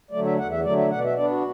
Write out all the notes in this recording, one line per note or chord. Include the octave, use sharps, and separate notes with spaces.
D3 F#3 A3 D5
E5
E2 F#5
E5
D3 F#3 A3 D5
E5
B2 F#5
D5
E5
B3 D4 D5
F#4